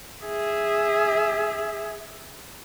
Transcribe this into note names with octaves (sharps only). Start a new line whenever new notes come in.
G#4 E5